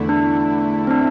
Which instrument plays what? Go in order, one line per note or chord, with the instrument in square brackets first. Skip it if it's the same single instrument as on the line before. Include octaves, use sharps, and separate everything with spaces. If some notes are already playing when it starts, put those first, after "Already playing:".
Already playing: [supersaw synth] E2 D3 A3 E4
[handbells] D4
C4
D4